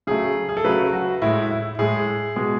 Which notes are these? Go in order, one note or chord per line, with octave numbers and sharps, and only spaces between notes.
C#3 F#3 A3 G#4
G#4
A4
C#3 F#3 A3 B4
F#4
A2 G#3 E4
E4
A2 G#3 G#4
B2 G#3